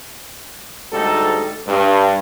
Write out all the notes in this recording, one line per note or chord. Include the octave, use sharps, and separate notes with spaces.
D2 G#2 G3 D#4 A4
G2